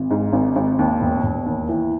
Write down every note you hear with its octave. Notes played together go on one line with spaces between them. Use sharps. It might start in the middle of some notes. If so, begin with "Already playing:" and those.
Already playing: G#1
G#2
G#1
G#1
D#2
E1
E1
D#2
E3